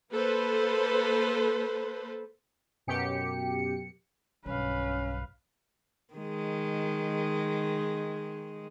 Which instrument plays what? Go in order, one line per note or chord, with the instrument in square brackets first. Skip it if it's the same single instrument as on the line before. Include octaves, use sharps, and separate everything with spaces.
[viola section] A#3 A4 B4 C5
[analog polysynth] F#2 B2 G4 C#7
[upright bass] B1 G2 [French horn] C#4 [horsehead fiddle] B4 F5
[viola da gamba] D#3 G#3